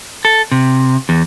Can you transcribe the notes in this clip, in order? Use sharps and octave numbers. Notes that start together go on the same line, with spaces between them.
A4
C3
E2